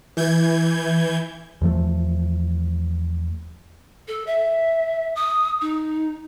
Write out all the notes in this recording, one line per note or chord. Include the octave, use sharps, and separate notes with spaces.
E3 G6 G#6
E2 F3 A3
A4
E5
D#6
D#4